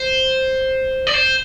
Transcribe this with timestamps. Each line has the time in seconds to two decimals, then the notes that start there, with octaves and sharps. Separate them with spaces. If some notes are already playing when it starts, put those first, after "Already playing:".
Already playing: C5
1.07 D5
1.14 C5